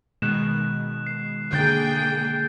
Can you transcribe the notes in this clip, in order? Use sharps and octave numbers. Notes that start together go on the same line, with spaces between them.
B2 D#3 G#3 F#6 E7
C7
D3 A#3 G#4 G5 G6 A6